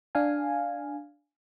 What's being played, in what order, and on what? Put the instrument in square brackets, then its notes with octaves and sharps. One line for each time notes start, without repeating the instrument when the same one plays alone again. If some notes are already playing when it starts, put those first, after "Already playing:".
[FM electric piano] D4 F5 G#5